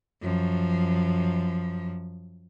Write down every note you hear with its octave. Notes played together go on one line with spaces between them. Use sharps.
F#2 F3